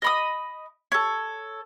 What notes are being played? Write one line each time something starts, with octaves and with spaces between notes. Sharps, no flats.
D#5 B5 D#6
A4 C#5